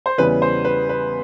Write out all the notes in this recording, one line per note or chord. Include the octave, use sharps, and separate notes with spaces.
C5
E2 C#3 E3 G3 B4
C5
B4
B4